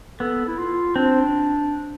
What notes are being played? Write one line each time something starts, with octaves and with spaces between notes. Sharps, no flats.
B3 A4
E4
F4
C4 D4